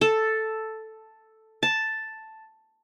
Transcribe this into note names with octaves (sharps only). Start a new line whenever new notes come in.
A4
A5